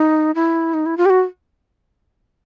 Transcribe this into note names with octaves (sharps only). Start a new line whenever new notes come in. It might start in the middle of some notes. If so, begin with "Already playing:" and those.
Already playing: D#4
E4
D#4
E4
F4
G4
F#4